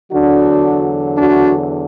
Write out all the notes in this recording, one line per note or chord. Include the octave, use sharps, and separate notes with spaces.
E2 D3 F#3 D4 F#4
D4 F#4